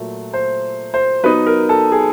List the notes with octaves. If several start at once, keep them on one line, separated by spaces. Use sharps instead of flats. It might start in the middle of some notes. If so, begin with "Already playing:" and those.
Already playing: A#2 F#3 A3
C5
C5
F#3 B3 D#4 B4
A#4
A4
G#4